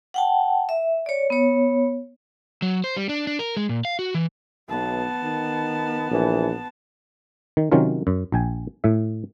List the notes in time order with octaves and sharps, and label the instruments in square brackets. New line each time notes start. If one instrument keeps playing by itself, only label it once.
[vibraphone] F#5 G5 A5
E5
C#5 D5
B3 C#5
[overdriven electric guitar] F#3
C5
G3
D4
D4
A#4
G#3
A#2
F5
F#4
E3
[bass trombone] B1 [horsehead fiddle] B3 A5
[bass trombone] D#3
[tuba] A#1 [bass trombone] E3
[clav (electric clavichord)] D#3
C3 D#3 F#3 C#4 F4 A#4
F#2
A#1 G5 G#5
A2 E5